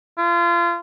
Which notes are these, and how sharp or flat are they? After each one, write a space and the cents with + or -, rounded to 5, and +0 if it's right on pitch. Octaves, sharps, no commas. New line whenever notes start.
F4 -30